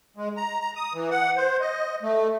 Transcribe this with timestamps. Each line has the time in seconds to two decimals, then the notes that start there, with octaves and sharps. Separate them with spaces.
0.16 G#3
0.36 A#5
0.60 A#5
0.76 D#6
0.94 E3
1.11 F#5
1.37 C5
1.61 D#5
2.03 A3